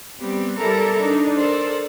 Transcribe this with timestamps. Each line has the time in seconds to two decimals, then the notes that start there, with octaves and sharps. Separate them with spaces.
0.20 G3 B3 C4 G4
0.57 G3 E4 G4 A4 A#4 A#5
0.99 D4 D#4
1.35 A4 A#4 C5 D5